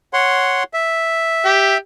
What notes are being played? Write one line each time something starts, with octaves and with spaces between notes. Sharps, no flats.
C#5 F#5 C6
E5
G4